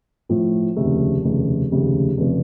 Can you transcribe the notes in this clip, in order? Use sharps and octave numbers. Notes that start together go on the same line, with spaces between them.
A2 F3 A3
F1 D#2 C#3 A3
F1 D#2 C#3 A3
F1 D#2 C#3 A3
F1 C#3 A3